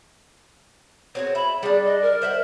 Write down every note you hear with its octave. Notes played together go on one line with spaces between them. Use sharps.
C4 F#4 G#4 C#5
E5 B5
G3 D4 G#4
D#5
A#4
C5 E5 F#5